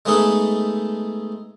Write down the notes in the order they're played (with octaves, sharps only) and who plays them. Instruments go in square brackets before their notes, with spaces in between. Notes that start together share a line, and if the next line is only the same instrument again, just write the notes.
[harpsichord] G#3 A3 B3 D#4 G#4 A4